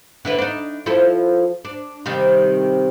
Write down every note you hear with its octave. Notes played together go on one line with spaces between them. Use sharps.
D3 E4 B4
D4 D#4
F3 E4 A4
D4
C3 D#3 G3